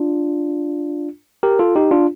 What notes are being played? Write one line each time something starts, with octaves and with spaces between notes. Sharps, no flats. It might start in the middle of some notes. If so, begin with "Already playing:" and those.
Already playing: D4 F4
G4 A#4
F4 A4
D#4 G4
D4 F4